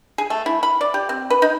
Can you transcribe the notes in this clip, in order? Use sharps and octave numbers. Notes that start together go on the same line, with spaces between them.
G#4
A3
E4
B5
D5
G4
C4
B4
D#4